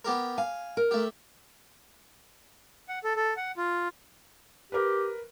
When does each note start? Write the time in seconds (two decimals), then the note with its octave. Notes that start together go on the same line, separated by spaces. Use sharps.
0.05 B3 G4 A#4
0.38 F5 G#5
0.77 A#4
0.91 A3 G4
2.89 F#5
3.04 A4
3.16 A4
3.37 F#5
3.57 F4
4.72 G4 A#4 B4